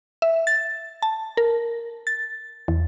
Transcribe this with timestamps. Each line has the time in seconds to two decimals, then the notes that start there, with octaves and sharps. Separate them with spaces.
0.22 E5
0.47 A6
1.02 A5
1.37 A#4
2.07 A6
2.68 E2